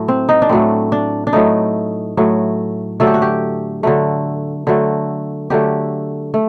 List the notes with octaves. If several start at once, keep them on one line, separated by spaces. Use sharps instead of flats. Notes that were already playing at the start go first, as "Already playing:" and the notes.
Already playing: A2 F#3 A3
C4
D#4
D4
A2 F#3 A3 C4
D4
D4
A2 F#3 A3 D#4
A2 F#3 A3
D3 F#3 A3 A4
G4
F#4
G4
D3 F#3 A3
D3 F#3 A3
D3 F#3 A3 G4
A3